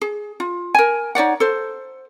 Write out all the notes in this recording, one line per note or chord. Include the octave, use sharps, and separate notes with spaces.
G#4
F4
A#4 G#5
D#4 C#5 D5 F#5
A4 C5